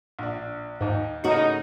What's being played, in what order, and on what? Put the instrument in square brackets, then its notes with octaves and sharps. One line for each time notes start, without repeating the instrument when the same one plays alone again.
[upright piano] A#1 D4
[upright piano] D#2 D#4 [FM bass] G#2
[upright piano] C#3 A#4 C#7 [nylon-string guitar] A3 C#4 F#4 [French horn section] D#4